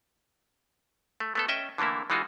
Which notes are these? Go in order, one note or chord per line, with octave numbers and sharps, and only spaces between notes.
A3
A3 B3 A4
C#4 D#5 E5 G5
D3 E3 A3 A#3 E4
E3 G#3 D#4 F4 F#4